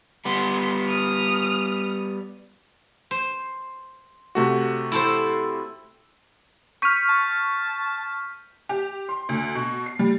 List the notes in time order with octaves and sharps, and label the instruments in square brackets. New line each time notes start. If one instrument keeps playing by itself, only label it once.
[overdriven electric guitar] G3 B3 [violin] C6
[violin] D#6 F6
[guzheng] C5
[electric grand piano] C3 A3 F#4
[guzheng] E4 A4 C5
[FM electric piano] C#6 F6 [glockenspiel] G6 B6 D#7
[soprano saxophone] A5
[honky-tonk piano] G4
C6
D2
B2
C7
G3